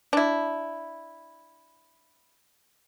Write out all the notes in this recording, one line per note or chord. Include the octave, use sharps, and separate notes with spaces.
D4 E4